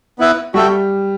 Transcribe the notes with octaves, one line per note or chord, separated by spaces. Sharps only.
B3 E4 B4 E5
G3 F#4 A4 E5 G5